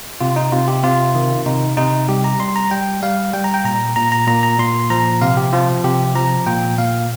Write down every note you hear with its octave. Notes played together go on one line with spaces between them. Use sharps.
C3 F4
D#4
C3 F4
G4
C3 F4
D#3
C3 D#4
C3 D#4
G3 G4
A#5
G3 C6
A#5
G3 G5
G3 F5
G3 G5
A#5
G5
A#2 A#5
A#2 A#5
A#5
A#2 A#5
A#5
A#2 C6
F3 A#5
C3 F5
G4
F3 F4
C3 G4
F3 A#5
A#2 G5
A#2 F5